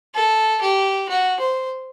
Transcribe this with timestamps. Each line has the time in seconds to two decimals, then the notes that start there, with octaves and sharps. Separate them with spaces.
0.15 A4
0.61 G4
1.09 F#4
1.40 C5